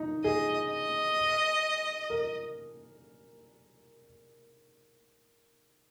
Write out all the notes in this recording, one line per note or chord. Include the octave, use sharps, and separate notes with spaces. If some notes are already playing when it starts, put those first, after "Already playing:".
Already playing: D#4
G#4 D#5
D#5
A#4